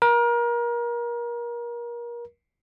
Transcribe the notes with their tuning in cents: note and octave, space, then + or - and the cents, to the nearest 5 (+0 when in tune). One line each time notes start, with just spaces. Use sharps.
A#4 +30